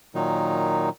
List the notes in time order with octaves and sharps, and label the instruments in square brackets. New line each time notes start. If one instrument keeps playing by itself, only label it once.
[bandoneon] A#2 D#3 F#3 D#4